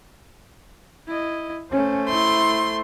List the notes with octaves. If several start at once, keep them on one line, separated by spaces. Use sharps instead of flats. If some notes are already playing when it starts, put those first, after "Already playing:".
E4 D#5
A3 C#4 C5
E4 C6